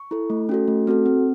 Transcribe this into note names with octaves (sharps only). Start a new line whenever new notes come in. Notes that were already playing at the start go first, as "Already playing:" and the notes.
Already playing: C#6
E4 A4
A3
C#4 F#4 A4
A3
C4 F#4 A4
C4